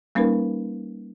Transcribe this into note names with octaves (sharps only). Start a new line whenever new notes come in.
G3 A#3 C#4 D#4 A#4 B4